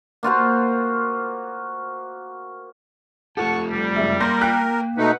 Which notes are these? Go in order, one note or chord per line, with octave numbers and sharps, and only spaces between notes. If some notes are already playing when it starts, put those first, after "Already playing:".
A#3 F4 F#4 C5
A3 F4 G4 A4 F#5 A5 C#6
G3
F#1 G#3 E5
A#3 A#4 C6 G6 A#6
G5 F#6 B6
B2 A3 D#4 B4 F#5